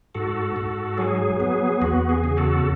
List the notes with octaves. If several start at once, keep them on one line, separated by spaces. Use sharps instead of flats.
G#2 F#4 A4
G#2
F#3 G#4
B3 G#4
E2 F#4
G#4
C#3
F#4 A4